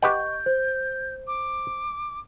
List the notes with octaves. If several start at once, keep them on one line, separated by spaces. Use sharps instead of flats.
G4 B4 D#5 F#5 C#6 G6
C5
D6